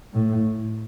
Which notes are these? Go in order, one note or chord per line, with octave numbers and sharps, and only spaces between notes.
A2